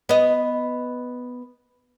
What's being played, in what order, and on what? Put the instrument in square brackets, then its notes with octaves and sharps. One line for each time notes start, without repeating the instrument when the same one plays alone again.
[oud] B3 D#5